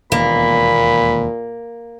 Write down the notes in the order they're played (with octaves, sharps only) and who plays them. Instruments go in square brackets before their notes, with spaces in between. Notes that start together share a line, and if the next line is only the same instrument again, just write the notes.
[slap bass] E1 D#2 [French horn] A#2 [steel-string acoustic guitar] A#3 [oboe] B5